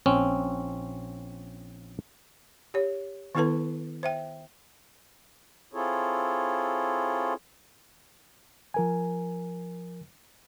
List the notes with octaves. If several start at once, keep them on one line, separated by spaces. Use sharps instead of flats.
A#1 C4 C#4
G4 C#5
D#3 B3 E4 A4 B4 A5
C5 E5 G5
C4 E4 F4 G#4 A4 C#5
F3 A#4 G#5